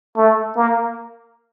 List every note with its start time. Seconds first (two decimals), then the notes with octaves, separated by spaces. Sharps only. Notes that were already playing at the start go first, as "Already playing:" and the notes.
0.17 A3
0.56 A#3